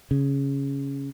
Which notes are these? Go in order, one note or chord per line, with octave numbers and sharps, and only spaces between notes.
C#3